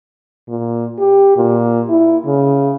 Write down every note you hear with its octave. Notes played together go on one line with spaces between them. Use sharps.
A#2
G4
A#2
E4
C#3